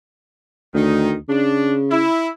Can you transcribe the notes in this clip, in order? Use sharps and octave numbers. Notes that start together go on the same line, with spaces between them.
D2 D#3 D#4
C#3 D4
E4